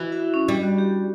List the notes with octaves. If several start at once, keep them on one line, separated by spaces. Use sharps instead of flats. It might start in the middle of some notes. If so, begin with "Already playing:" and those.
Already playing: E3 F#4
F#4
E4
C#4
G3 D4
F#4
G4